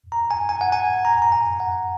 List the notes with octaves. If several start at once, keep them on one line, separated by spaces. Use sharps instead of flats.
A#5
G#5
G#5
F#5
G#5
A#5
A#5
G#5
F#5